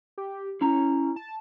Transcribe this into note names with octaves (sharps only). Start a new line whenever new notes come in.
G4
C#4 E4 A#5
A5